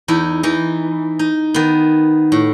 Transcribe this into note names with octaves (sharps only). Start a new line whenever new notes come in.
E2 D#4 E4
E3 D#4
D#4
D#3 B3
A2